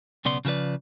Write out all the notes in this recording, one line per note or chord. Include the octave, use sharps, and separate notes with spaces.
B1 C#3 B3 D5 C6
C#3 F3 F#4 B4 D5